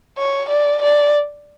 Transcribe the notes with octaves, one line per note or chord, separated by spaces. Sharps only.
C#5
D5
D5